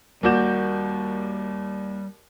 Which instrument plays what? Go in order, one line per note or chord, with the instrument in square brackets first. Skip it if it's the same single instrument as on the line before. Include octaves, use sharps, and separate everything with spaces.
[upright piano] D#2 D5 G6 [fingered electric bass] G3 [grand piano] A#3 F#4 E7